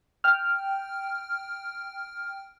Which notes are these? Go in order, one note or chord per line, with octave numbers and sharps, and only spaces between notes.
G5 F6